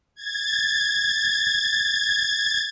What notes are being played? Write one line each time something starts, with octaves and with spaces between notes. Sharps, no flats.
G#6 A6